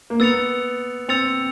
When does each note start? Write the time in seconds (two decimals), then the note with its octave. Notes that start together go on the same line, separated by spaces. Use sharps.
0.10 A#3
0.20 B3 E6 A6 C#7 F7
1.09 C4 E6 A6 C#7 F7